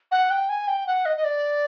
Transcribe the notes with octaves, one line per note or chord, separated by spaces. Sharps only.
F#5
G5
G#5
G5
F#5
D#5
D#5
D5